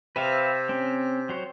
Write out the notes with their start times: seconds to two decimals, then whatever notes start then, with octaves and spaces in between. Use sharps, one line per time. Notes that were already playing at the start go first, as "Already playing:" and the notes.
0.16 C3 B4 E5 F5
0.69 C4 C#4
1.29 F#3 C5 C#5